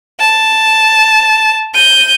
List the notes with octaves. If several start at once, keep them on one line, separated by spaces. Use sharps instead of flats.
A5
G6 D#7